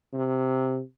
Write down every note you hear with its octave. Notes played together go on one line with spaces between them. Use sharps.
C3